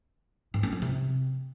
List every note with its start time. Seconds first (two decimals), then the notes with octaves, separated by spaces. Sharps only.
0.54 G#2
0.63 C#4
0.73 F3
0.82 C3